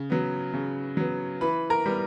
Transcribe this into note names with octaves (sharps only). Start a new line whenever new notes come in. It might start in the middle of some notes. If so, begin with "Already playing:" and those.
Already playing: C#3
F#3 B3
C#3
F#3 B3
E3 B4 B5
A#4 A#5
G3 B3